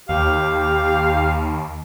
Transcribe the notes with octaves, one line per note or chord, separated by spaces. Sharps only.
D#2 G4 F5